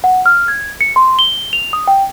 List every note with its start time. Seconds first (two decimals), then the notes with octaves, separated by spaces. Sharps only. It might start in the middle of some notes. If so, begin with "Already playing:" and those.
0.04 F#5
0.26 F6
0.48 G#6
0.81 C#7
0.96 C6
1.19 G7
1.53 F7
1.73 D#6
1.88 G5